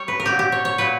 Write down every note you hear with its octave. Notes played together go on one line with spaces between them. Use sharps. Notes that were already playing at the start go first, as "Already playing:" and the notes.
Already playing: G3 C#5
B4
A#4
A#2 F#3 G4
G4
C#5
C#5
A#2 F#3 B4